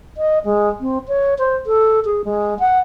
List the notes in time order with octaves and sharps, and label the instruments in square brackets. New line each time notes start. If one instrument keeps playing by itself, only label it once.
[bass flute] D#5
G#3
C4
C#5
C5
A4
G#4
G#3
F#5